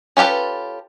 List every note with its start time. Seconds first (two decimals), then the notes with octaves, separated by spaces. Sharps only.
0.17 C#4 F4 G4 A4 B4